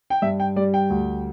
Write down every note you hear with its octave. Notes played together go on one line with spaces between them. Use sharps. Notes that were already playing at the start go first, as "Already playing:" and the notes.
G5
G2 E5
G5
G3 D5
G5
D2